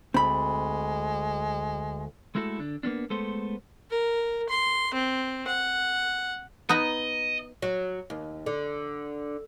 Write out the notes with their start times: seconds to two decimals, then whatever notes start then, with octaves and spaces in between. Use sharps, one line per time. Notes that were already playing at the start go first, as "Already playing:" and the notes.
0.14 D2 G#3 C4 B5
2.35 G#3 A3 E4 F#4 A4
2.60 D3 D4
2.83 A#3 B3 C#4 D4
3.10 G#3 A3 B3 A4 C5
3.91 A#4
4.49 C6
4.94 C4
5.47 F#5
6.69 B3 D#4 D#5 A#5
7.62 F#3
8.10 D#2
8.46 D3